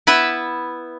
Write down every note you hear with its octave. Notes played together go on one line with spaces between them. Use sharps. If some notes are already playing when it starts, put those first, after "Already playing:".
B3 E4 B4 E5